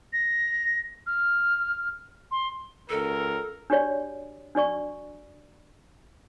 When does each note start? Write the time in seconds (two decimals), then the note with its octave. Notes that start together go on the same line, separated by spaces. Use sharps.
0.13 A#6
1.06 F6
2.31 C6
2.90 C#2 A4 A#4
3.70 D4 F#4 G4 C#5 D5
4.55 D4 F#4 D5 C#6